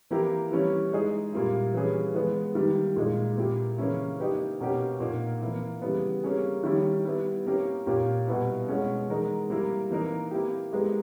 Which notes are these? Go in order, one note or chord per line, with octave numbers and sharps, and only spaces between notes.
E3 A#3 E4 G4 A#4
E3 G3 C#4 E4
G#3 D#4 G#4
A#2 G3 A#3 E4
E3 G3 C#4 G#4 B4
E3 G#3 B3
D#3 G3 A#3 E4
A#2 G#3 D#4
A#2 A#3 E4 G4
C#3 E3 A#3 C#4 E4
A#3 D#4 G4 B4
B2 A#3 C#4 G4
A#2 A#3 D#4
E3 A#3 E4
C#3 E3 G3 B3
G3 A#3 C#4 G#4
D#3 G3 C#4 E4
G3 B3 E4
A#3 C#4 G4 A#4
A#2 A#3 C#4 G4
B2 G3 B3 E4
B2 G#3 C#4
E3 G#3 D#4 A#4
G3 A#3 E4 A#4
E3 A#3 D#4 A#4
A#3 E4 G4
G#3 B3 G4 A#4